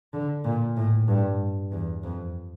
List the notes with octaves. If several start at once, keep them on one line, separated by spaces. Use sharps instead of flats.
D3
A#2
A2
G2
E2
F2